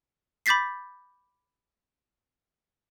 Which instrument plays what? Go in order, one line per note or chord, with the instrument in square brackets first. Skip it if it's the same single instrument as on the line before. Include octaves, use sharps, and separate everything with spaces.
[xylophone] B5 D6 G6 A6 B6 C7